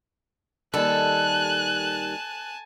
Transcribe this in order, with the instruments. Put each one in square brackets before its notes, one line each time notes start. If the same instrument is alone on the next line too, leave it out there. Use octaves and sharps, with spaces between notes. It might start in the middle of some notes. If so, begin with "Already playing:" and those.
[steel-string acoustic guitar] D#2 D#3 G3 [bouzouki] A4 [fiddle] G#5 A5 [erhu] F#6